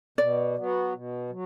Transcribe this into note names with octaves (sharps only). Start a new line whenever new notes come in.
B2 D5
F#3 B3
B2
F#3